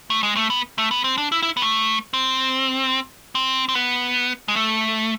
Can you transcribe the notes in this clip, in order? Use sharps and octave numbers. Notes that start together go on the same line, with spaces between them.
A3
G#3
A3
B3
A3
B3
C4
D4
E4
E4
B3
A3
C4
C4
C4
B3
G#3
A3